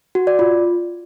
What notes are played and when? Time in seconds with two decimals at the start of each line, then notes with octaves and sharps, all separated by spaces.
0.15 F#4
0.27 D5
0.39 F4